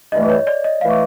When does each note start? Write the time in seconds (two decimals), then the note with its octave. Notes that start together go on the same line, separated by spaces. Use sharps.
0.12 G2 E3 A3 D#5
0.30 C#5
0.47 D5
0.64 D#5
0.81 E3 A3 F5